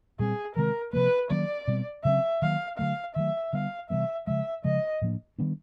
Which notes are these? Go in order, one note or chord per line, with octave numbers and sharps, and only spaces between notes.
A#2 G3 C4 G#4
C3 D#3 G#3 C4 A#4
C3 F3 A#3 B4
D#3 F#3 A#3 C#4 D5
B2 G3 C4
C#3 F#3 A3 C4 E5
D#3 F#3 A#3 F5
D3 F#3 A3 F5
D#3 F#3 A3 E5
D3 G3 B3 F5
C3 E3 G3 B3 E5
C#3 F3 G#3 E5
C#3 F3 G#3 D#5
A2 F3 A#3 D4
D#3 G3 B3 D4